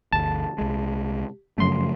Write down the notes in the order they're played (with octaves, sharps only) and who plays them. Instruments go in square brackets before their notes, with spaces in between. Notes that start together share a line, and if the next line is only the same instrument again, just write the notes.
[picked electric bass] G1 D2 [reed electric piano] A5
[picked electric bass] C2 G#3
[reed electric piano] F#2 C6 [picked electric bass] C#3 F3 A3